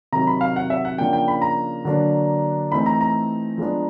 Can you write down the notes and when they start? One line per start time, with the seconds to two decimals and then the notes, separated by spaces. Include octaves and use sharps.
0.12 C3 D#3 F#3 A#5
0.27 B5
0.41 F5
0.56 F#5
0.70 E5
0.85 F#5
0.98 C#3 F3 A#3 D4 G5
1.13 G5
1.28 B5
1.42 A#5
1.85 D3 F#3 A#3 D4
2.72 E3 A3 C4 D#4 B5
2.86 A#5
3.01 A#5
3.58 F3 G#3 B3 D4